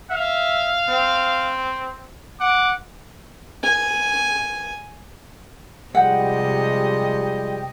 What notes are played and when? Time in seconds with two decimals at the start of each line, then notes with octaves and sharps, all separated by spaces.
0.11 E5 F5
0.89 C4
2.40 F#5 D6
3.63 G#5
5.95 C3 F3 G3 G#3 D#5 F#5 G5